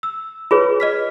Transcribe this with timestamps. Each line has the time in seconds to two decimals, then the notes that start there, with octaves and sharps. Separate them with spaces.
0.03 E6
0.51 F4 G#4 B4 C#5
0.80 D#5 F6 B6